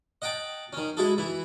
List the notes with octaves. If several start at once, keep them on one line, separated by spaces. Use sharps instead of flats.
D#5 F#5 G5 A5
D#3 C#4
G#3 E4 F#4 G#4 A4
E3 E4